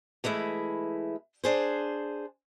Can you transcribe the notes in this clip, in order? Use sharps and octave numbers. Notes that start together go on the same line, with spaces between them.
E3 G#3 A3 E4
D4 G#4 C5